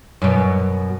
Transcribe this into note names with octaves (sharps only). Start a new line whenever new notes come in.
F#2 B2